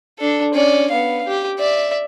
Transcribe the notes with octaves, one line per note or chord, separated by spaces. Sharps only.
D4 A4
C#4 D5
B3 F5
G4
D5 E5